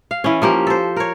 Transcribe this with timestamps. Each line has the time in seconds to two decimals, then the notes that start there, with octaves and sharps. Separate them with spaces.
0.11 F5
0.24 E3 C#4
0.42 F3 A#3 G4
0.67 A4 C5
0.96 A#4 C#5